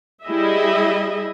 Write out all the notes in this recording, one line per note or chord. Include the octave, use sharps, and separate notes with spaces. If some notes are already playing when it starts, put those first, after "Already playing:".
G3 E4 G#4 D#5 E5